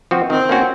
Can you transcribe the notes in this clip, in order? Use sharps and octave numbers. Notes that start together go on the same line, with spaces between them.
F3 C4 F#4
D#3 C4
A#3 C#4 F#4